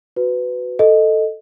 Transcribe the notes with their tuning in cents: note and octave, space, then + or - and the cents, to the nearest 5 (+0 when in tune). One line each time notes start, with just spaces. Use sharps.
F#4 +0 B4 +20
A4 +5 D#5 +0